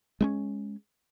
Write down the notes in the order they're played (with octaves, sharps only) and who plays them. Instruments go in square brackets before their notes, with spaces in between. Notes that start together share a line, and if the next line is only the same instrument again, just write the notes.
[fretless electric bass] G#3 B3 C#4